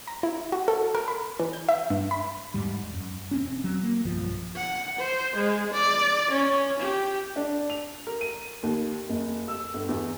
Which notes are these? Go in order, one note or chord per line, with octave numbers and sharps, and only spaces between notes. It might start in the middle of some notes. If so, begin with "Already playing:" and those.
A#5
E4
F#4
A4
A#4
B5
E3
G6
E5
G2
B5
E2 G#2 G3
F#2
E1 C4 C#4
F#3
A#3
B1 G2 F3
F#5
C5
G#3
D5
C#4
G4
D4
F7
A#4
D#7
D#2
F#1
E6
G1
E2